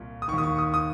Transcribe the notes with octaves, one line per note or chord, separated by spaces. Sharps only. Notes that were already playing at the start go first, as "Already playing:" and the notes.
Already playing: C2 A#2
D#6
D#3 C#6
D#2 D#6
C#6
D#6
D#6